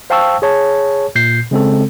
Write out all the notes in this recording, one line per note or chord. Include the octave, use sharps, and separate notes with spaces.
C5 F5 G5 A5 C#6 E6
G#4 C#5 A5
A#2 G6 C7
C#3 G#3 C4 A4